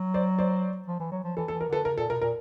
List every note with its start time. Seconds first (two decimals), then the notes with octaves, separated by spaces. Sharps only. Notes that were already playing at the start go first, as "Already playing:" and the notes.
Already playing: F#3
0.14 C5 D5
0.39 C5 D5
0.87 F3
1.00 E3
1.12 F#3
1.24 F3
1.36 E3 A4
1.48 A4
1.53 E3
1.61 A#4
1.69 D3 A4 B4
1.85 C#3 A#4
1.98 A#2 A4
2.09 B2 A#4
2.22 A#2 A#4